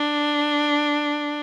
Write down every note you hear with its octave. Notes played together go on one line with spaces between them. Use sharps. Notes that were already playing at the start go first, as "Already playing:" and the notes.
Already playing: D4